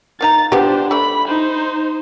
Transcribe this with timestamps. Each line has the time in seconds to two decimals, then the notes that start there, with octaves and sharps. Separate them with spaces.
0.21 A#3 D#4 A#5 A6
0.52 F3 B3 D4 G4 C5
0.91 A3 D5 B5
1.28 D#4 C5